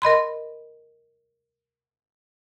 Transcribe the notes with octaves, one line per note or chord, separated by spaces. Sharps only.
A#4 D#5 B5 C6